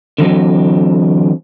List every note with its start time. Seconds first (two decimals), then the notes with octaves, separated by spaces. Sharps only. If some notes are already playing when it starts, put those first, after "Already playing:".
0.18 D3 E3 F#3 C4